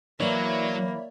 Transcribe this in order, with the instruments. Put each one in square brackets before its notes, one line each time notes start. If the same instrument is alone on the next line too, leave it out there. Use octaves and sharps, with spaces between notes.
[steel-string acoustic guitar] E3 E4 [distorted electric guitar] F#3 [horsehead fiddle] A#3 [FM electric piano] C#5 D5 E5